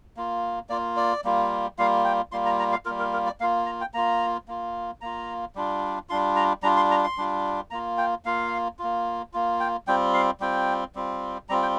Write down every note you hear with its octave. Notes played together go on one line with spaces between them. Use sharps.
A#3 F4
A#3 F4 D5
D5
G3 A#3 F4
G3 A#3 F4 F5
G5
G3 A#3 F4 C6
A#5
A#5
F5
G3 A#3 F4 A#4
A#4
A#4
D5
A#3 F4 F5
A#5
G5
A#3 F4 A#5
A#3 F4
A#3 F4 A#5
G3 D4 F4
G3 D4 F4 C6
A#5
G3 D4 F4 A#5
C6
A#5
C6
G3 D4 F4
A#3 F4 A#5
G5
A#3 F4 F5
A#3 F4
A#3 F4
G5
G3 C4 F4 G5
F5
G3 C4 F4 G5
G3 C4 F4
G3 C4 F4 A#5
G5